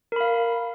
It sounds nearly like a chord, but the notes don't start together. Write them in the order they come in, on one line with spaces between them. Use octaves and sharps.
A#4 B5 F5